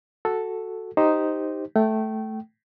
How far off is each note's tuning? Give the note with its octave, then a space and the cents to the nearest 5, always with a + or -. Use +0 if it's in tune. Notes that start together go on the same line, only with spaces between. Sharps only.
F#4 +0 A4 +0
D#4 +0 G4 +0 C5 +0
A3 -5 G5 -25